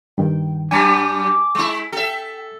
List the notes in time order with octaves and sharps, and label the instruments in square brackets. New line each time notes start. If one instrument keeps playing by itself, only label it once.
[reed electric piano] G2 D#3 [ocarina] G5
[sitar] F#2 G3 [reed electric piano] G#5 A5 [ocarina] D6
[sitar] G#3 E4
[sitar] A4 E5 [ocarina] G5